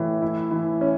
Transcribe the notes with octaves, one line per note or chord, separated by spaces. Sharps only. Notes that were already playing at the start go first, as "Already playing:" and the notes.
Already playing: A2 E3
E4
E3
C#4